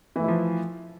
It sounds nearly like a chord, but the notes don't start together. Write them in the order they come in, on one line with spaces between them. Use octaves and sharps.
E3 A3 E4 F3